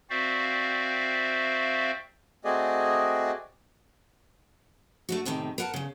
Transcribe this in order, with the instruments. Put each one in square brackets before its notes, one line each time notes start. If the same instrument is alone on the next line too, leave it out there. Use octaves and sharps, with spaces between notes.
[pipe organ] C4 F#4 C5 D5 E5 F5
[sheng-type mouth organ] A3 C4 F#4 G#4 D5 D#5
[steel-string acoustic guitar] A3 D4 F#4
E2 A2 C3 D#3
A#4 B4 F#5 G5 A5
E2 C#3